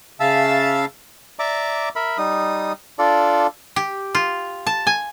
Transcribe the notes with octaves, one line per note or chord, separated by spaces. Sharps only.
C#3 E5 F5 A5 E6
D5 E5 A#5 D6
A#4 E5 B5
G3 D#4 D#6
D4 F4 A4 D5
G4
F4
A5
G#5